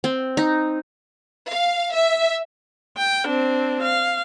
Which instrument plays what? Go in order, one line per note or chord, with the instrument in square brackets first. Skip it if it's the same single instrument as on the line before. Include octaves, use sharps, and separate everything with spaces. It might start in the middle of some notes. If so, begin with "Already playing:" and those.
[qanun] C4
D#4
[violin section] F5
E5
[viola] G5
C4 D4
F5